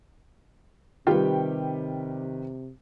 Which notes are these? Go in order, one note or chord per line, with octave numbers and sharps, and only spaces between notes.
C3 D#3 G3 F4 G4 B4 G5